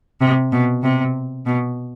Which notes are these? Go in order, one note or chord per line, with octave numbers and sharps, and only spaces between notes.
C3
B2
C3
B2